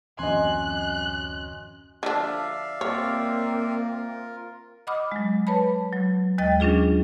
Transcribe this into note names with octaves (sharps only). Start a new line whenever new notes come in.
D1 F#2 E3 C4 D#5 G#5 C6 F#6
D3 F3 D4 D5 E5 F5
A#3 C4 F4 A#4 C#5
D#5 F#5 B5 D6 D#6 F6
F#3 G#3
B4 C#5 A5 B5
F#3
D#2 G#3 D#5 G5 A6
F#3 C#4 D4 F4 G#4